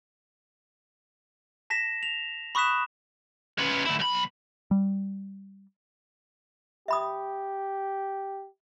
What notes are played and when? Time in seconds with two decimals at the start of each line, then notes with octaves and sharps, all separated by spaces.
1.70 A5 A#6 B6 E7
2.03 F7
2.55 B5 C#6 D#6 F#6 B6 E7
3.59 C#4 B4
3.85 D2 E4
3.99 B1 B5
4.71 G3
6.88 G4 E5 B5 D#6